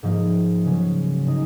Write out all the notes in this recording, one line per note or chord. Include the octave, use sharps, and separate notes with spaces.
G#2 F3 A#3 D#4
C#3 F#3 C#4
C#3 G#3 D#4